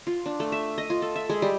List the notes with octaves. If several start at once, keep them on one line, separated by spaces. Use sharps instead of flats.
F4
D4
A3
E5
D#5
F4
A4
E5
G#3
G3